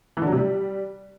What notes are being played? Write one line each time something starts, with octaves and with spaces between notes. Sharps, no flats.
E3
D3
F#3
C3
G3